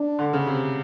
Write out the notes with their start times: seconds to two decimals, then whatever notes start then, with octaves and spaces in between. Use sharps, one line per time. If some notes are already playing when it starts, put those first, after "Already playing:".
Already playing: D4
0.19 D3
0.33 C#3
0.47 C3